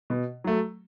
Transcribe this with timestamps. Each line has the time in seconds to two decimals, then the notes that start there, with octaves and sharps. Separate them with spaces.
0.10 B2
0.44 F#3 A3